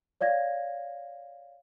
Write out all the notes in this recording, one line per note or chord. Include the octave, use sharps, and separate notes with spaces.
C#5 D5 F5 G#6 A#6